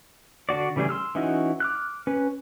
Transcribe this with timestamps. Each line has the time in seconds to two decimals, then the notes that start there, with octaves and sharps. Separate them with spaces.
0.49 D3 D4 F#4 D5
0.76 C#3 E3 G3 A3 G#4
0.89 C6 E6 F6
1.15 E3 C#4 D#4 E4 F#4
1.60 D6 F6 F#6
2.07 C#4 B4